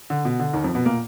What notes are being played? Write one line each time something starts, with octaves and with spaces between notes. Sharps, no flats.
D3
B2
D3
D#2 D#3
F2 F3
B2 B3
A#2 A#3